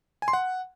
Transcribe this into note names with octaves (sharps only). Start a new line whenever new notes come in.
G#5
C6
F#5